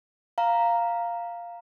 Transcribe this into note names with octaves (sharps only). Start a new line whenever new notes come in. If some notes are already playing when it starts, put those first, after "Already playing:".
F5 A#5